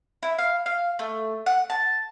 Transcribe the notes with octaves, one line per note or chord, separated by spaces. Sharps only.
E4
F5
F5
A3
F#5
A5